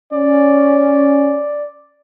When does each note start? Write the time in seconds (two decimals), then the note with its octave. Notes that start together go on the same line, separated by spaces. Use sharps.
0.13 C#4 D5